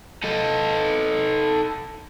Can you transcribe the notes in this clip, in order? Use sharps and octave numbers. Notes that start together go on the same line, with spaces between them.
D#4 A4